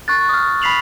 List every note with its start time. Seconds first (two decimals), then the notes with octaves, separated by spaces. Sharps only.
0.08 C#6 F#6 A6
0.29 D#6 F6
0.62 B5 B6 C7 F7 F#7